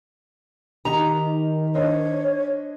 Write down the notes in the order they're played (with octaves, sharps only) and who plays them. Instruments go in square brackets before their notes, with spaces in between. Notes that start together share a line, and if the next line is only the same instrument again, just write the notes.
[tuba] D#3 [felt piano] D#4 G4 [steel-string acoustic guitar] A#5
[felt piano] D4 C5 D#5 [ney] C#5